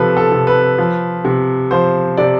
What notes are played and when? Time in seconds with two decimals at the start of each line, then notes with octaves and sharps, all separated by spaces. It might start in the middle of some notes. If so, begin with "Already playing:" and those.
Already playing: C3 F3 A4 B4
0.17 A4
0.32 C3
0.47 B4
0.78 F3
1.25 C3
1.71 F3 C5
2.17 C3 D5